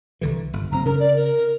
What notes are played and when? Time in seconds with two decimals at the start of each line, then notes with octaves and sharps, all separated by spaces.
0.21 C2 D3 E3
0.53 G1
0.72 F#1 C4 A#5
0.85 C#3 A#4
1.00 D5
1.16 A#4